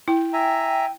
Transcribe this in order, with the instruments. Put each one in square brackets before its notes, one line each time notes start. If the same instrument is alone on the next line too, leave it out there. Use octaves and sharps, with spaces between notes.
[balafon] E4 [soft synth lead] G5
[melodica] E5 G#5 A#5